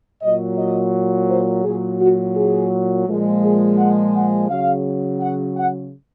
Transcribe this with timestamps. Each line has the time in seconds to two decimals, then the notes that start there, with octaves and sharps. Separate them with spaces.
0.22 A#2 F#3 D#5
0.57 D#5
1.29 C5
1.64 A#2 F#3 G#4
2.00 F#4
2.36 G#4
3.07 A#2 F3 G#3
3.42 G#4
3.78 F#5
4.14 F#5
4.49 C#3 F#3 F5
5.20 F#5
5.56 F#5